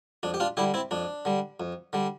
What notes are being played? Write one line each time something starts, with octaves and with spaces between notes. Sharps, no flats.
F2 D4
G4
D4 F4
D3 G3 E4 G4
C4 E4
F2 D4
D3 G3
F2
D3 G3